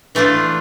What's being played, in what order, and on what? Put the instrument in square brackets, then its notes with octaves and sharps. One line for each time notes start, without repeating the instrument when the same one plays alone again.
[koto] E3 A3 D4 F4